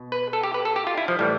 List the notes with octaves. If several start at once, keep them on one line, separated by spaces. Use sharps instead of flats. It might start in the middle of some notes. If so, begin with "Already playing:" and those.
Already playing: B2
B4
A4
G4
B4
A4
G4
F4
E4
F3
A2 E3 G3